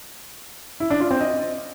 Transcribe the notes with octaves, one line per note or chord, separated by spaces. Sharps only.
E4
D4
F4
C4
D#5